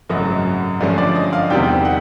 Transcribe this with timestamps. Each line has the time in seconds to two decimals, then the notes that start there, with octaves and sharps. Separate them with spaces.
0.09 G#1 F#2 C#3 F#3 A3 D#5
0.80 G2 D3 F3 A3 C#4
0.98 D5
1.15 D#5
1.33 F5
1.50 E2 C3 D#3 G3 C4 G5
1.85 F#5